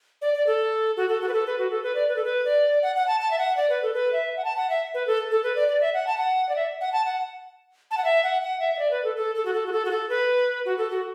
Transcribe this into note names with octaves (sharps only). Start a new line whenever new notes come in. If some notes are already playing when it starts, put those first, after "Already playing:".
D5
D5
A4
F#4
A4
F#4
B4
A4
B4
F#4
A4
B4
D5
B4
A4
B4
D5
F#5
F#5
A5
A5
E5
F#5
D5
B4
A4
B4
E5
F#5
A5
F#5
E5
B4
A4
A4
B4
D5
D5
E5
F#5
A5
F#5
D5
E5
F#5
A5
F#5
A5
F#5
E5
F#5
F#5
E5
E5
D5
B4
A4
A4
A4
F#4
A4
F#4
A4
F#4
A4
B4
F#4
A4
F#4